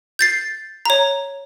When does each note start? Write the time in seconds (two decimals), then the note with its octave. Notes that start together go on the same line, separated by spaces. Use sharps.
0.19 G6 A6 C7
0.85 C#5 A#5